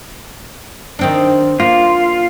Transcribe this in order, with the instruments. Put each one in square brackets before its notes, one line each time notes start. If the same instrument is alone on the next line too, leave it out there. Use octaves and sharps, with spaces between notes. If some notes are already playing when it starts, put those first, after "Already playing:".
[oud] D#3 C4 D4
[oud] A#3 [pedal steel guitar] F4